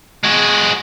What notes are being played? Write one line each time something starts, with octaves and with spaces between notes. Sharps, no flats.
G#3 F#4